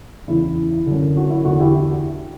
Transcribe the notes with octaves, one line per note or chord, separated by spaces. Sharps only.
E2 C#3 E3 E4
F#2 D3
F#4
E4
E2 D3 F#4
E4 G4